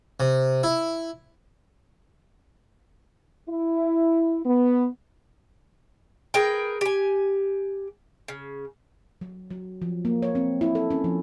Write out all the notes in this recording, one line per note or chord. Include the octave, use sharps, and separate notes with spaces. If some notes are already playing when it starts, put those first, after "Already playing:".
C3
E4
E4
B3
G#4 A#4 B4 G5
G4 G#5
C#3
F#3
F#3
F3
A#3
C#5
C4
E4
A4
C#4
F3